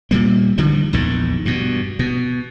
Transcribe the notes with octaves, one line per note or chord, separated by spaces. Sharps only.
A#2 G3 A#3
D3 D#3 F3 G3
A#1 E2 G#2 D#3
G2 B2
B2